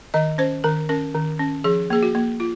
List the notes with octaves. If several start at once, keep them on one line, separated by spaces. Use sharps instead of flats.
D#3 D#5
C#4 C5
D#3 A#4
C#4 A#4
D#3
C#4
F3 G#4
A#3 G#4
F#4
A#3
F4